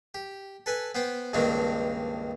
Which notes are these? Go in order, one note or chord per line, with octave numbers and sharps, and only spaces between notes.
G4
A4 B4 G#5 A5
B3 C5 G5
C#2 G2 D#3 A#3 C4 D4